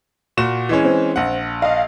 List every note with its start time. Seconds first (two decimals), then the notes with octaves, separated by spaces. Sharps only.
0.37 A#2 F#4 E7
0.69 E3 G#3 C#4
0.85 C4
1.16 A#1 F#5
1.62 D#5 F5